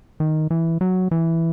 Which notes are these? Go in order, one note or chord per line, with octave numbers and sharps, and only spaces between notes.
D#3
E3
F#3
E3